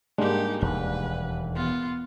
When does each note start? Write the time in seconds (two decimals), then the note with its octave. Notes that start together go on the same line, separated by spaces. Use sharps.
0.18 G#2 G3 G#3 A#3 D4 D#4 G4
0.62 E1 D#2 B4
1.55 B3 F4